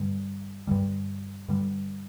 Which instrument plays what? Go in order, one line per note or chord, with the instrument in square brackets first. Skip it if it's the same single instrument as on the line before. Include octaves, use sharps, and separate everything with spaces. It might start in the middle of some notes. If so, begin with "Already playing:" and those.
Already playing: [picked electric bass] G2 D3 G3
G2 D3 G3
G2 D3 G3